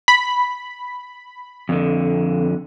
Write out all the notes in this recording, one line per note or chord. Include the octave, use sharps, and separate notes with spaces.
B5
F2 D3